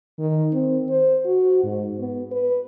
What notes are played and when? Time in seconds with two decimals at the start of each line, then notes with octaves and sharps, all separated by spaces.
0.19 D#3
0.53 C4
0.90 C5
1.26 F#4
1.64 G#2
1.99 B3
2.32 B4